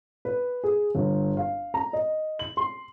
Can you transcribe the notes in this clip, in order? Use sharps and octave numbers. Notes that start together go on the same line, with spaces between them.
B4
G#4
G1
F5
A#5
D#5
F#7
C6